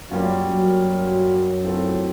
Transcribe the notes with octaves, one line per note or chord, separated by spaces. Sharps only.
F#2 F#3 G3 A#3 C#4 F4
F#2 F#3
E3 A3 C4 F4 A4